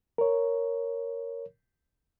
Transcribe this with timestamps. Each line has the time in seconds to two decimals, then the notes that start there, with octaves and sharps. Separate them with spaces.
0.18 A#4 C#5